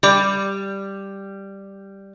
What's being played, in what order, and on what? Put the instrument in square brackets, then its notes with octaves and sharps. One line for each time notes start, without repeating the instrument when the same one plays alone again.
[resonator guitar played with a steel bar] G3 [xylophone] D5 B5 D6